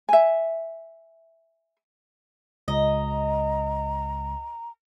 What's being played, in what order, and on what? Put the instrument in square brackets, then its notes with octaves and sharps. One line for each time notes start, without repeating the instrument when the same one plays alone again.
[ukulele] E5 G#5
[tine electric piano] C#2 [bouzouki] D#5 [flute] A#5